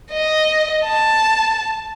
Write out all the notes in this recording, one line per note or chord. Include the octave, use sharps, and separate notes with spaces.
D#5
A5